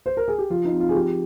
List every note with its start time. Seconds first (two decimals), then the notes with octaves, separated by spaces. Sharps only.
0.06 C5
0.17 A#4
0.28 G#4
0.38 G4
0.50 F3 F4
0.65 D#4
0.72 C4
0.80 F4
0.89 G#4
0.95 F3 G4